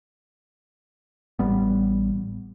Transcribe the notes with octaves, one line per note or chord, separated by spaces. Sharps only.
A1 G3 B3